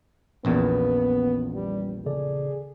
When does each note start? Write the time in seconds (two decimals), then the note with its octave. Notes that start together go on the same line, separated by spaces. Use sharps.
0.45 A#1 E2 A#2 B3 C#4 B4
1.54 G3
2.06 C#3 G#4 A4 D5